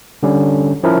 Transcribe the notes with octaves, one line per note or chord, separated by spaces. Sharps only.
D3 G3 C#4
F3 C#4 E4 A#4